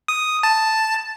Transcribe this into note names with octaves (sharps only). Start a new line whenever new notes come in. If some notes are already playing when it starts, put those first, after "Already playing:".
D#6
A5